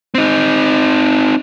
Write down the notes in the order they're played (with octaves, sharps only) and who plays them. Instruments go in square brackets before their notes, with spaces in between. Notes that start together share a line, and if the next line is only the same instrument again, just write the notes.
[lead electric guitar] C4 D#4